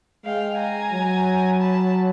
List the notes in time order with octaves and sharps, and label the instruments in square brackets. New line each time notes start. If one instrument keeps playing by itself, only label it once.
[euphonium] G#3 [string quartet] F5 G5
[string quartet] G#5 A#5
[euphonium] F#3
[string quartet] A5 B5